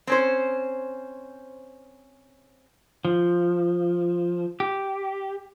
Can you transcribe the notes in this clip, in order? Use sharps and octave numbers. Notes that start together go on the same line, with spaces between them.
C4 C#4 C5
F3
G4